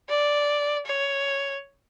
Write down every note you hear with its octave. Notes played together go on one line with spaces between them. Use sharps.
D5
C#5